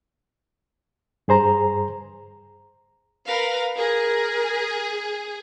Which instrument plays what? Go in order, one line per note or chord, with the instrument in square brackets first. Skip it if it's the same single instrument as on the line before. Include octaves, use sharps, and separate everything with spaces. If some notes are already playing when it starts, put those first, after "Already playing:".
[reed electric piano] G2 G#4 C5 A#5
[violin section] A#4 B4 F5
[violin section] G#4 [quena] A#4